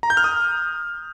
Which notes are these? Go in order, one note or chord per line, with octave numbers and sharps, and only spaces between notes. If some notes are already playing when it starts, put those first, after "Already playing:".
A#5
G6
F6
D#6